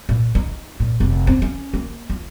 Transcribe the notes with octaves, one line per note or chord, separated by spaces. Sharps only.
A#2
D#4
A#2
F1
C4
C#4
A#3
F4